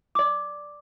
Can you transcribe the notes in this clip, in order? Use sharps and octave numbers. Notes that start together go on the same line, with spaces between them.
D5 D6